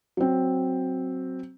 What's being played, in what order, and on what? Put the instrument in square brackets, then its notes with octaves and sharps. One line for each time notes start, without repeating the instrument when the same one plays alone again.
[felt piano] F#3 C4